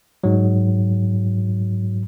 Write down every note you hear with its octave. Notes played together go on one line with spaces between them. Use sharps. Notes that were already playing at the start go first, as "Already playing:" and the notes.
G#2 F#3